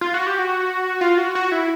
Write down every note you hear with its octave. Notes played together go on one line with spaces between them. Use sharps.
F4
F#4
G4
F#4
F4
F#4
F#4
E4